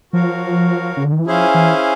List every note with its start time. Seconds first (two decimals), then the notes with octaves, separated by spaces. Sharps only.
0.12 F3 F#4 A#4 C#5 F5
0.97 C#3
1.05 D3
1.12 D#3
1.19 E3
1.26 F3 C#4 E4 G#4 C5 F5
1.54 E3